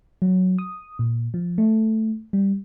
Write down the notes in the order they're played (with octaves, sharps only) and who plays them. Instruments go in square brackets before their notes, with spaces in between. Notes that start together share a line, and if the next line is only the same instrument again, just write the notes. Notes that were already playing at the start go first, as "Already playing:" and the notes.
[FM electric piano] F#3
D#6
A#2
F3
A3
G3